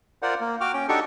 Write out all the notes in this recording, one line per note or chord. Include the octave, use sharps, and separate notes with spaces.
F4 A#4 C5 D5 F#5
A#3
F#4 G5 D6 F6
C#4 G5
D4 D#4 F#4 G4 A4 C#6